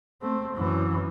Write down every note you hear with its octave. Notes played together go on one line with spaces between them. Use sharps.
A3 C4
F#2 E3